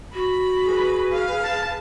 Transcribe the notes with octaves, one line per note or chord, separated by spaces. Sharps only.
F#4 B5
G#4 B4
F5
A5